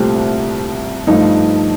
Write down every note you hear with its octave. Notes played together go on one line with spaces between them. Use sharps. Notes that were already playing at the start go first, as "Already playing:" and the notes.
Already playing: C2 A#2 A3 C4 G4
G2 F3 A3 D#4